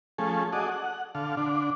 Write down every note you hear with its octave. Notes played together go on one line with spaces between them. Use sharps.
F3 A3 C#4 G#4 A4
F#4 G#4 A4 D5 D#5
F#5
D3 A4 F5
D3 D4